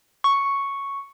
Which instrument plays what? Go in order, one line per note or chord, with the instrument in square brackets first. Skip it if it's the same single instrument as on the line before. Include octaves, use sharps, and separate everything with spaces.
[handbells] C#6